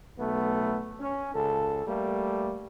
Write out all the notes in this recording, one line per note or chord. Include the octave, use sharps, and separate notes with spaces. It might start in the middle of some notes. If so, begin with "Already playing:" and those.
B1 A3 B3
C#4
C#2 A4
G3 A3 A#3